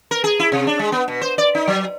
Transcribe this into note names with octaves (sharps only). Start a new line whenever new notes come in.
A#4
G#4
E4
C3
D4
G#3
B3
B2
C5
D5
D#4
F#3